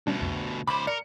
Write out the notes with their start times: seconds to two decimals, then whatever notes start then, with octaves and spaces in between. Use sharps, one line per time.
0.07 D2 B2 G3 C#4 D4
0.20 C2 F2
0.67 C#2 C5 B5 D6
0.87 A#4 D5 C#7